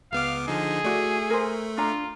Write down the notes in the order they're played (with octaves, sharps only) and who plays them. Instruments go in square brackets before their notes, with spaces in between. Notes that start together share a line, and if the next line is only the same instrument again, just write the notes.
[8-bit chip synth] C#2 B3 D6 [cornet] F5
[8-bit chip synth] D3 F3 D#4 [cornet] G#4
[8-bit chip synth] A3 [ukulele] E4 F#4 D5
[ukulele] A#4 C5
[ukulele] D4 A#5 [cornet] F4